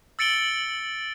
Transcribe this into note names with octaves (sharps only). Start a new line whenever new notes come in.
E6 A6 C#7 D7 F#7 G7